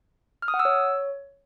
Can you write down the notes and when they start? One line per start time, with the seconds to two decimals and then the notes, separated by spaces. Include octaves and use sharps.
0.42 F6
0.48 D#6
0.54 F#5
0.59 E6
0.65 C#5